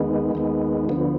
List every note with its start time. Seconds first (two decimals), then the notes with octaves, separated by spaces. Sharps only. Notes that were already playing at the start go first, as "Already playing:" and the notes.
Already playing: D#2 D#3 G#3 B3
0.35 D#2 D#3 G#3 B3
0.89 D2 D3 F3 B3